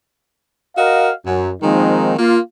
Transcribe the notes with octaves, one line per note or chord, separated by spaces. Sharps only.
F#4 A#4 D#5 F5
F#2
D#3 F3 G#3 A#3 C4 D#4
A#3 F4